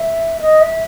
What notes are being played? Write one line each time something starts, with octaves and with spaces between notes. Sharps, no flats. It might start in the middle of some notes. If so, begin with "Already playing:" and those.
Already playing: E5
D#5
E5